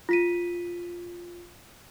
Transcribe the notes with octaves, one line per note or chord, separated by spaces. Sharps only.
F4 B6 D#7